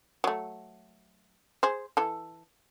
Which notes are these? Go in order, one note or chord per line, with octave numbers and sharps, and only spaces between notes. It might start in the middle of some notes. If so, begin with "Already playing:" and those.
F#3 A3
G#4 C5
E3 A4